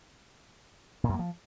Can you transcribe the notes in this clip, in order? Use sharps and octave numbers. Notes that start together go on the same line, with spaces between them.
A#2
F#2
A#3
F3